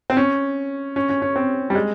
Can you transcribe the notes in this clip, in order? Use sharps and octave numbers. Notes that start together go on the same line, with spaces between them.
C4
C#4
C#4
C#4
C#4
C4
G3
G#3